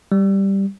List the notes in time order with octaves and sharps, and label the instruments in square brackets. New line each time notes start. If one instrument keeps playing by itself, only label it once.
[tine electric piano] G3